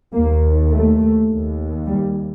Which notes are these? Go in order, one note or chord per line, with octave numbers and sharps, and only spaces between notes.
D#2 A#3
A3
D#2
G3